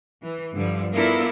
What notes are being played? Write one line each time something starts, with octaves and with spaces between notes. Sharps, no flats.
E3
G2 D3 F3 G3
B3 D4 E4 F4 A4 A#4